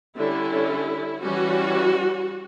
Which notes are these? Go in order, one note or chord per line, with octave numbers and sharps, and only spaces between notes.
D3 G3 C#4 E4
E3 G3 C#4 F#4